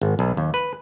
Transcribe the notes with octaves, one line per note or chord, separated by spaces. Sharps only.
G#1
B1
D#2
B4